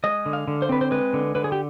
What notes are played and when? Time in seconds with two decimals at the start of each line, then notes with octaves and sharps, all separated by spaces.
0.04 G#3 D#5
0.26 D3
0.33 F5
0.48 D3
0.62 C5
0.69 C4 B4
0.81 C5
0.91 G#3 B4
1.13 D3
1.35 D3 B4
1.44 G#4
1.52 G4